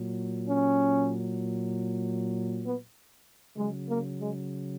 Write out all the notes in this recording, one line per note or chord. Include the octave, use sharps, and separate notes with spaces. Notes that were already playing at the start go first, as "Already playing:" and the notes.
Already playing: A#2 F#3
C#4
B3
C#3 F#3 G#3
A#3
G#3